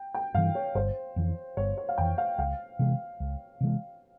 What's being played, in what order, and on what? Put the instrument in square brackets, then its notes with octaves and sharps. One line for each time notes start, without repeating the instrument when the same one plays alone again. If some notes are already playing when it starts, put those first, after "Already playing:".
Already playing: [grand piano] G5
G5
[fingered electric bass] G2 E3 [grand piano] F5
[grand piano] C#5
[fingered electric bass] G1 [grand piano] C5
[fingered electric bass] F2 E3
[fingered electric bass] G1 [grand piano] C#5
[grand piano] C#5
F5
[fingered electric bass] F2 E3 [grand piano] G5
[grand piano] F5
[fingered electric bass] C#2 [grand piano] F5
[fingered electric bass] C3 E3 G#3
C#2
C3 E3 G#3